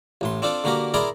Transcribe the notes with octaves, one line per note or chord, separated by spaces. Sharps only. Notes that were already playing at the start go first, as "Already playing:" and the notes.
A1 A2 C6
C4 D4 F4 A4 C5
D3 A#3 F#4 G4 A#4
E4 G#4 A#4 D5 A#5 C6